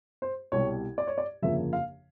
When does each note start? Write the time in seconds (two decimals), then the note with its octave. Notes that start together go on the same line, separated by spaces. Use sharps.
0.22 C5
0.52 C2 B2 G3 C#5
0.98 D5
1.07 C#5
1.18 D5
1.42 G1 F2 C#3 F3 A#3 E5
1.73 F5